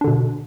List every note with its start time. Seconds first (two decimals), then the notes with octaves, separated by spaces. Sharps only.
0.01 D4
0.04 D3
0.08 B2